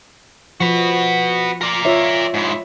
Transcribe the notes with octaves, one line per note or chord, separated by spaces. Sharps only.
F3 F#4 B4
A#4 D5
F4 C#5 E5
G#2 E4